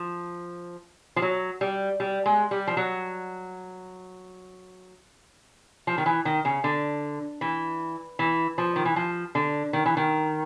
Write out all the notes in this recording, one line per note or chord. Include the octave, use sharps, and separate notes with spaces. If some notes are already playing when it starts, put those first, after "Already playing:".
Already playing: F3
F3
F#3
G3
G3
G#3
G3
F3
F#3
F3
D#3
E3
D#3
C#3
D3
E3
E3
F3
D#3
E3
F3
D3
D#3
E3
D#3